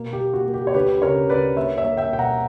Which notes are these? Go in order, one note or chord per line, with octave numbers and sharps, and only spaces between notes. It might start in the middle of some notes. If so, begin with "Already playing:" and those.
Already playing: B2 A#3
G4
A#3
F#4
A#3
G4
C#5
D2 G4 B4
C#3 A#4 C#5
D2 B4 D5
A#3 C#5 E5
C#5 E5
A#3
E5 G5
B2 G5
F#5 A#5